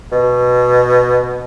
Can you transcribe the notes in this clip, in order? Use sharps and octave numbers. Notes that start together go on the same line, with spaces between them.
B2